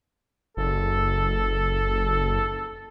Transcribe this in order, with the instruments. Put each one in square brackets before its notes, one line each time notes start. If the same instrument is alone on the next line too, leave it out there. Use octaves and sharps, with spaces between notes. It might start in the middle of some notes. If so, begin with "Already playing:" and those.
[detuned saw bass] F#1 [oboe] A4